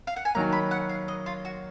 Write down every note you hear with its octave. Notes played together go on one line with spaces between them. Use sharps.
F5
F#5
G#5
D#3 F#3 A#3 A#5
B5
F#5
F5
D#5
F4
F#4